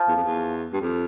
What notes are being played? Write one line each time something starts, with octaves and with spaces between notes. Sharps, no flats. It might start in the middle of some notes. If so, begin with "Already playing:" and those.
Already playing: F3
E2
F2
E2
G2
F2